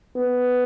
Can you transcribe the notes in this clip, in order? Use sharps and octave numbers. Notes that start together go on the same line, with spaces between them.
B3